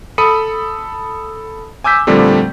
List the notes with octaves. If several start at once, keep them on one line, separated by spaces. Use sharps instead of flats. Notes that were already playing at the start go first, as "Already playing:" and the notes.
A4 B5 D#6 C#7 D#7
G#5 D6 E6 G6 B6
A#2 D3 F3 G3 A3 C4